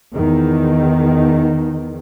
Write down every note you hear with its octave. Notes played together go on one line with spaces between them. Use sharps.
E2 D#3